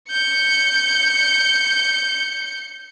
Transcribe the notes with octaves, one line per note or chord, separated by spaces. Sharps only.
G6 C#7